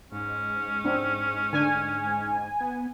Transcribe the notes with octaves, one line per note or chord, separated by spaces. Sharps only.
G#2 C#4
C4 D4
D3 D4 G#5
B3